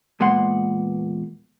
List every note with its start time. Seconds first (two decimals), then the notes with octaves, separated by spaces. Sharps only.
0.20 E2 A#2 G#3 B3 F#5 C6